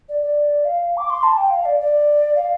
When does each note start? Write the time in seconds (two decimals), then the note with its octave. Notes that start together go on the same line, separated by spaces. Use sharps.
0.09 D5
0.23 D5
0.65 F5
0.97 D6
1.10 C6
1.23 A5
1.38 G5
1.50 F5
1.65 D5
1.80 D5
2.36 F5